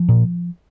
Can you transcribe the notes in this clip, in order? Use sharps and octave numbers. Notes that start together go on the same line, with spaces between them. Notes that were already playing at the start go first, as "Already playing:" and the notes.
Already playing: F3
A#2